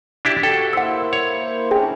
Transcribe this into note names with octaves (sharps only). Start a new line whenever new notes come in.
D4 E4 G4
F#4 G4 A4 G5
A#3 E4 C5 F#5 E6
C#5
C#4 D4 E4 G#4 G5